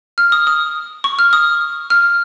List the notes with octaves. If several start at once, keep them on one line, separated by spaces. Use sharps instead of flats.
F6
D#6
D#6
C#6
F6
D#6
F6